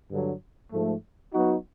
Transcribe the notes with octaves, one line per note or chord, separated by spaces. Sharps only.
G2 D3 F#3
G#2 F3 A3
F#3 B3 D#4 F#4